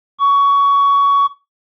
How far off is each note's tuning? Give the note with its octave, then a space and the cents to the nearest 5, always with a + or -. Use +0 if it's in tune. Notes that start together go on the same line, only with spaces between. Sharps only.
C#6 +20